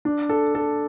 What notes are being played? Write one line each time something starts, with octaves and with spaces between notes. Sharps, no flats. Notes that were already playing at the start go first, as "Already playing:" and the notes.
D4
A4
A4